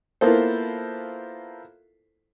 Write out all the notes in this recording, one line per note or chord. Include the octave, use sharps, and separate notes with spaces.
A#3 B3 E4 F4 A4 C5